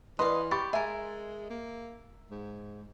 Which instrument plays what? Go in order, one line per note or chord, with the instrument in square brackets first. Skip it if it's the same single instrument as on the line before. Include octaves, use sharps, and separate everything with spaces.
[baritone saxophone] E3 [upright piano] B4 D5 [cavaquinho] D#5 F5 [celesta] C6
[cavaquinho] G4 [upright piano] B5 C#6 A6
[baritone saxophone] G#3 [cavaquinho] A#4 G#5 [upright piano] E5
[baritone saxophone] A#3
G#2